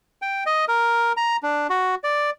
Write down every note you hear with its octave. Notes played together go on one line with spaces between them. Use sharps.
G5
D#5
A#4
A#5
D4
F#4
D5